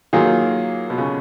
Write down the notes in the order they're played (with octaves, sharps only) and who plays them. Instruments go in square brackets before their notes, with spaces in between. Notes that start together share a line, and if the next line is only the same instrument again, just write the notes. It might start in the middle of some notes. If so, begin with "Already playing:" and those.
[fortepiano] D#3 [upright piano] F#3 A#3 F4 G#4
[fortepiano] B2
C#3